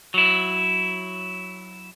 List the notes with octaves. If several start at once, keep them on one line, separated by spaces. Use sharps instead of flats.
F#3 E4